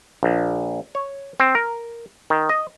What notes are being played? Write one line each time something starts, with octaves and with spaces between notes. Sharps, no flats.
A#1
C#5
C4
A#4
D#3
D#5